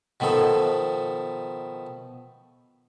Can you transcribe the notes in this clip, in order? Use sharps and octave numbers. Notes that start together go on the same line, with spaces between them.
B2 D#3 F3 A4